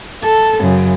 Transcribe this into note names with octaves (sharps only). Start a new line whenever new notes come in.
A4
F#2 C#3